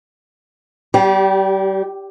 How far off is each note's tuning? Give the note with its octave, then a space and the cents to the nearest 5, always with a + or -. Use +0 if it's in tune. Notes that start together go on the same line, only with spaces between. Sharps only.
G3 -30 G4 +0